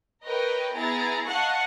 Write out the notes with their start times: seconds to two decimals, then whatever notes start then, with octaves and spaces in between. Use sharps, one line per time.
0.23 A#4 B4 C#5 D#5 G5
0.72 B3 E4 G#4 A#5 A6
1.25 D#5 F5 F#5 A5 C#6 F#6